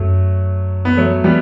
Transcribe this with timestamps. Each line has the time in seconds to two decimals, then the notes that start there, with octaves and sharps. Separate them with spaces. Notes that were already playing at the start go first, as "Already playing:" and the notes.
Already playing: F#2 F#3 A3
0.85 B3
0.97 F#3 A3
1.24 G3 B3